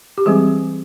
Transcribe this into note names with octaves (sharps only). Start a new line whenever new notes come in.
G4
E3 G3 G#3 C4 G#4